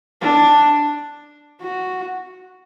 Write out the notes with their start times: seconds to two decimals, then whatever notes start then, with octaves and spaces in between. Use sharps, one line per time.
0.21 D4
1.61 F#4